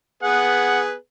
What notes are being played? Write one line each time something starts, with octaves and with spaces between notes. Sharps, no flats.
B3 G#4 B4 F#5